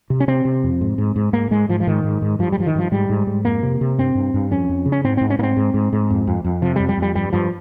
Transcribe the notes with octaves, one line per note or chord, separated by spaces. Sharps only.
C3
C#4
C3 C4
C3
F2
G#2
G#2
G#2
G#2 A#3
G#2 G#3
G#2 F3
F3
G#2 D#3
G#2
G#2
G2 F3
G3
G2 F3
D#3
G2 F3
G#2 G3
G#2
G#2
F2 A#3
C3
C3
G2 C4
G2
G2
F2 C#4
F2
C#3
C#4
G#2 C4
G#2 C4
C#4
G#2 A#3 C4
G#2
G#2
G#2
F2
F2
F2
C3 F3
G3
F2
G3
F2
G3
G2 G3
G2 F3